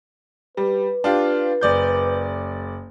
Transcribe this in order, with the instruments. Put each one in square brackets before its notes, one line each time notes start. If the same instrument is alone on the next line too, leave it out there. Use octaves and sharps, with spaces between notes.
[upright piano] G3 [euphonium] B4
[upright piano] D4 F4 G4
F#1 D5 G6